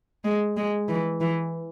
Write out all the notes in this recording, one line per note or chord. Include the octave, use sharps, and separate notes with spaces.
G#3
G#3
E3
E3